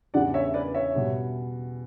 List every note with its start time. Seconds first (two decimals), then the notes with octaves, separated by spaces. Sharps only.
0.14 E2 C#3 E3 G3 D4 D5 F#5
0.34 C#5 E5
0.54 B4 D5
0.74 C#5 E5
0.94 B2 G3